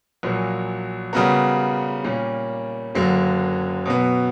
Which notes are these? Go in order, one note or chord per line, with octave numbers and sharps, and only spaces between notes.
A#1 A#2 F#3 A#3
C#3 G3 B3 F#4 A#4
A#2 G3 A#3 C#4
F#1 F#2 D3 F#3 A#3
B2 F#3 B3